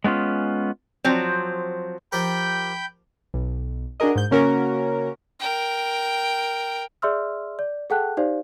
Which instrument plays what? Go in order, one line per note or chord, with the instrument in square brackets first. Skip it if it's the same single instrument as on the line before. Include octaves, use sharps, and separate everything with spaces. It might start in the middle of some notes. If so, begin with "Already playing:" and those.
[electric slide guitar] G#3 B3 C#4 F4
[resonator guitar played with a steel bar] F3 F#3 C4
[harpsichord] F3 G4 A#4 [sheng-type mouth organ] G5 B5 G6
[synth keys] B1
D4 F#4 G#4 A#4 D#5
G#2 G6
C#3 A#3 C#4 F#4 A#4
[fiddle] A#4 G5
[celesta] G#4 D5 E5 C6 E6 F6
D5
G#4 A4 F#5 G5 A5 F#6
D#4 G4 C5 D5 F5